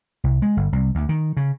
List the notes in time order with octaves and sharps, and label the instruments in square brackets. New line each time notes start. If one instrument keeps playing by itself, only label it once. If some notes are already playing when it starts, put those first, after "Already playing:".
[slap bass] C2
G#3
G1
C2
D2
D#3
C#3